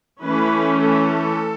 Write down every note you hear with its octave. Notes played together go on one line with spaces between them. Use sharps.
E3 A3 C#4 B4
A4